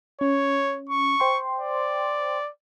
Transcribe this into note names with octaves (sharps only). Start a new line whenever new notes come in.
C#4 C#5
C#6
C5 G5 C6
D5